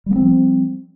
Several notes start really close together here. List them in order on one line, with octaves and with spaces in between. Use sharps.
G3 A#3 C4 F3